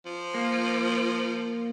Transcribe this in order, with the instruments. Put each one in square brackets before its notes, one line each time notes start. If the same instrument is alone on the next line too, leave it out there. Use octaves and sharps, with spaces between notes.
[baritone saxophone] F3
[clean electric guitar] A#3